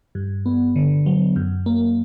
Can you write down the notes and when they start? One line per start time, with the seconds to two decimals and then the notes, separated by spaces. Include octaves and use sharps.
0.15 G2
0.46 B3
0.76 D3
1.06 F#3
1.36 F#2
1.66 A#3